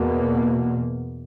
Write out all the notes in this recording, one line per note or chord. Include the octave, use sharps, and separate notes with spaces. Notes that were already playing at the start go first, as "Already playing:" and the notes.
Already playing: E2 B2 A#3